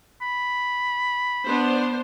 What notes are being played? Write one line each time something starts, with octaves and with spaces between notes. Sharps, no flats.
B5
B3 D4 C5